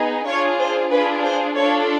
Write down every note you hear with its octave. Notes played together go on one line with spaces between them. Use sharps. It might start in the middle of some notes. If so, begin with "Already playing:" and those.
Already playing: B3 D#4 G#4
D4 F4 G#4 C#5
C5
D4 F4 G#4 B4
C5
D4 F4 A4 C#5